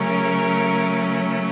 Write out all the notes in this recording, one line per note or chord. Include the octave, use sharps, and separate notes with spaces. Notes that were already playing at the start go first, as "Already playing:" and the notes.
Already playing: C#3 F#3 A3 C#4 A#4